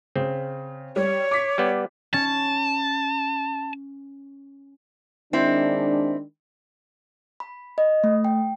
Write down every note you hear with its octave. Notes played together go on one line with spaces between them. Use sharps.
C#3 C4
G3 C#5
D6 B6
G3 B3
C#4 A5
D#3 G#3 C4 D4 E4
B5
D#5
A3
G5